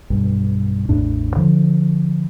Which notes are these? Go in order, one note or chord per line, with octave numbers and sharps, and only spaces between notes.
B1 G2
A1 E2 A2 D4
D3 F3